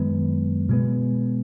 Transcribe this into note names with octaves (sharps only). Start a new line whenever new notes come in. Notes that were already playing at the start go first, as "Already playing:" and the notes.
Already playing: F#2 D#3 G#3 B3
B2 G#3 B3